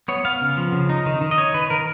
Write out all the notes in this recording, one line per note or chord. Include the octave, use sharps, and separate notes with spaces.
B3 C#5
B3 F5
C#3
F3
C#3
D#4
D#3
D#3
D#5
D#4 C#5
D#3 B4
D#3 A#4